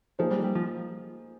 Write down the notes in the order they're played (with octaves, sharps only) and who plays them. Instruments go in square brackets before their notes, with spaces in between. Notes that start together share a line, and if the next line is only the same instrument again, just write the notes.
[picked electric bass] F3 [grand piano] A#3 D#4 G#4 C5
[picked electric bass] G3
G3
F3